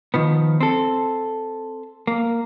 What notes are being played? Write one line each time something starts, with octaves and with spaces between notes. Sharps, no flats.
D#3 F3 B3
C4 A4
A#3